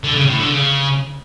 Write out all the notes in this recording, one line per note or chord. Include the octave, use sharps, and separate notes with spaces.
D3
C#3
A2
D3
C#3